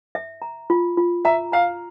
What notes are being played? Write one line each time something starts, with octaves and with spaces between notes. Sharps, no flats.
E5
A#5
F4
F4
E5 A#5
F5 A#5